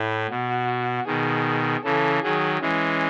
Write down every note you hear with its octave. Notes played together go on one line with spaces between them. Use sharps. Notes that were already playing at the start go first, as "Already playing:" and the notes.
Already playing: A2 E4
B2 F#4
B2 D#3 G#4
C#3 E3 A4
D#3 F#3 G#4
E3 G#3 C#4